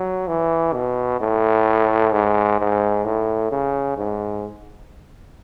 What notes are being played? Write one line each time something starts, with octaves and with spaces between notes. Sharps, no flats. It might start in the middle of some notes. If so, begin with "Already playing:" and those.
Already playing: F#3
E3
B2
A2
G#2
G#2
A2
C#3
G#2